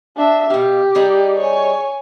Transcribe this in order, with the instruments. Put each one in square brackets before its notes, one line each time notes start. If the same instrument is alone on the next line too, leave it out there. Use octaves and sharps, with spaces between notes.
[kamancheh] D4 E5
[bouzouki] B2 F5 [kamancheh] G4
[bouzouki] G3 D#4 G#4
[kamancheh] C#5 G#5